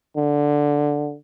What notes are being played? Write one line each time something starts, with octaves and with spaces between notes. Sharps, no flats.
D3